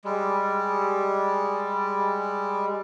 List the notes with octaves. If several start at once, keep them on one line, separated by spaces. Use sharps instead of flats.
G3 G#3